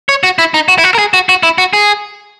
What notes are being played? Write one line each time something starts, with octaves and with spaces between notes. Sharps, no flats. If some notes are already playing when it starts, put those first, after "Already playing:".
C#5
F#4
E4
D#4
F#4
E4
F#4
A#4
G#4
F#4
F#4
E4
F#4
G#4